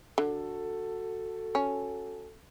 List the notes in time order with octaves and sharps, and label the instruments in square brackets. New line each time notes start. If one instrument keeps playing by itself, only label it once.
[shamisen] D3 [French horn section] F#4 A4
[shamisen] C#4